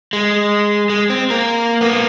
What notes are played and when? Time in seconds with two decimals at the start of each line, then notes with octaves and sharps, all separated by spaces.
0.13 G#3
0.90 G#3
1.10 C4
1.31 A#3 A#4
1.81 A#3 B3